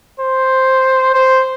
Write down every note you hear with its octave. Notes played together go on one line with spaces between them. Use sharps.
C5
C5